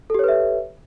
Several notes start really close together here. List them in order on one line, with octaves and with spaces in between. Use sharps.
A4 G4 C#5 B4 E5